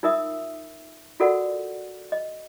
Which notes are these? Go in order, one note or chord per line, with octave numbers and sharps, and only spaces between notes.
D#4 F4 A#4 E5 D#6 E6
F4 F#4 A4 A#4 D5 F#5
D#5